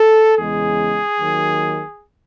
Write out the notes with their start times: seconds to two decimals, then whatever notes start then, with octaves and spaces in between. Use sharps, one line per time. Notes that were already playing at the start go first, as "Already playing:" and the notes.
Already playing: A4
0.37 E2 C#3 G#3 G#4
1.18 D#2 D#3 F#3